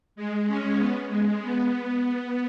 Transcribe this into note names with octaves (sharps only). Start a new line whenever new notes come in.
G#3
C#4
B3
G#3
B3